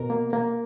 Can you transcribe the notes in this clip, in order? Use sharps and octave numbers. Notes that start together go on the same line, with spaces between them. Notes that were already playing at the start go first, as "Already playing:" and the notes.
Already playing: B2 A#4
A#3
A#3